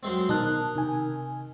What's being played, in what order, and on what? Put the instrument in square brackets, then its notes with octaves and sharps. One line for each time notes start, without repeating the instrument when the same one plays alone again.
[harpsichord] F#2 G#3 C4
[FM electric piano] B2 A5 F#6 [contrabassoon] D#3 [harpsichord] A#4 D#5
[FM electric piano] C3 G#5 [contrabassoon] D#3